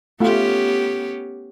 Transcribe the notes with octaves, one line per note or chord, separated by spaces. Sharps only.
A3 B3 C#4 F4 G4